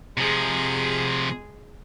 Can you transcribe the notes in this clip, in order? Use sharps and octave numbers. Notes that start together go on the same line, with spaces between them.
C3 F3 G#3 G#4